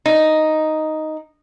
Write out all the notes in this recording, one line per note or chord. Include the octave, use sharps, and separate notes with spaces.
D#4